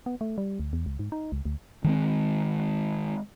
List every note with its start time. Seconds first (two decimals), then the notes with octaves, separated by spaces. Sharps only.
0.06 B3
0.21 A3
0.38 G3
0.60 D2
0.73 E2
0.86 C#2
0.99 G#2
1.12 D#4
1.32 C#2
1.45 D2
1.84 D#3 G#3 C4